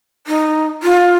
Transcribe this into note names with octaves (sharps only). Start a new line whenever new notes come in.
D#4
F4